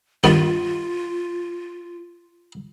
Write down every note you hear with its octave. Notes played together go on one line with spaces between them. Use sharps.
G2 D#3 B3 F4